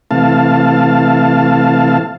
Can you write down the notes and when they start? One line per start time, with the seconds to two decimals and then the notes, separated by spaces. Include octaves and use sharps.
0.11 C3 E3 A3 F5 A5